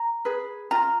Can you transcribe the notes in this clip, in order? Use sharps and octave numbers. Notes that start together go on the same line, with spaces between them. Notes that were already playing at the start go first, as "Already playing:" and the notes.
Already playing: A#5
G#4 B4
F4 A#5